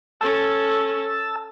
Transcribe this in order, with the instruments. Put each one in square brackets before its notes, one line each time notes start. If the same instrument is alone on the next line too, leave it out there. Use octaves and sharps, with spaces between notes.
[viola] C#4 A4 [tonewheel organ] A5 E6